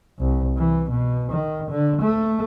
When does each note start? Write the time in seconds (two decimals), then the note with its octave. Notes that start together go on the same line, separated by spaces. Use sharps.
0.20 C2
0.57 E3
0.90 B2
1.31 D#3
1.71 D3
2.02 A3